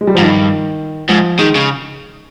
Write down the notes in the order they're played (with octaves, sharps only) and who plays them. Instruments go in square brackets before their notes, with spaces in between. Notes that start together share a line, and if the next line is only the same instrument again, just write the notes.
[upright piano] G#3
G3
F3
[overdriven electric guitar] G#2
[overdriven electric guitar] G2 [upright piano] D#3
[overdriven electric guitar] G#2 [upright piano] F3
[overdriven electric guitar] D#3 [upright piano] G#3
[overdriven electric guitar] C#3